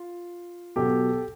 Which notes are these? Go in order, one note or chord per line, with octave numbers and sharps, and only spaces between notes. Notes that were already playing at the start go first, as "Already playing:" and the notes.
Already playing: F4
B2 F#3 G4 A4